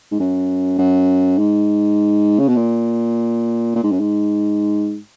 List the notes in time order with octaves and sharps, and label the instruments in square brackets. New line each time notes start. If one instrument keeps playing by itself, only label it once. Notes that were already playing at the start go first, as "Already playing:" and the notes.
[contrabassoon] G#2
F#2
F#2
G#2
C#3
B2
A#2
A#2
G#2
F#2
G#2